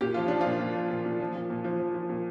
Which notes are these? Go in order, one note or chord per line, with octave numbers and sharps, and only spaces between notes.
A#2 G4
F3 F4
F3 D4
A#2 F4
A#2
F3
A#2
A#2
F3
A#2
A#2
F3
F3
F3
A#2